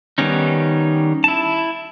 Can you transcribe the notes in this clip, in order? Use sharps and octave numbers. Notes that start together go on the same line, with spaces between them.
D#3 G3 B3 C#4 D#4
E4 A5